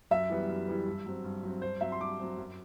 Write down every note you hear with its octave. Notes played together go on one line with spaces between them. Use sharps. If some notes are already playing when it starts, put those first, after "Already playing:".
F#2 E5
E3 G3 B3
F#2
E3 G3 B3
G2
F#3 C4
G2
F#3 C4
G2 C5
F#3 C4 E5
C6
G2 D6
F#3 C4
F#2